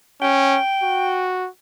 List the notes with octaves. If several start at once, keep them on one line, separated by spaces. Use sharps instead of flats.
C#4 G5
F#4